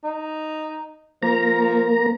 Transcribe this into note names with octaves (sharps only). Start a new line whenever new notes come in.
D#4
F3 A#3 A#5